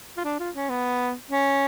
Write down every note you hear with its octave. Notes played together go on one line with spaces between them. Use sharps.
F4
D4
F4
C#4
B3
C#4